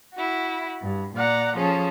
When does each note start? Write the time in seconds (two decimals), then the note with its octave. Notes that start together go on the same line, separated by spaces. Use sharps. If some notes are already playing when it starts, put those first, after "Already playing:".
0.14 E4 F#4
0.82 G2
1.15 A#2 D5 F#5 A#5
1.56 F3 C#4 G#4 A4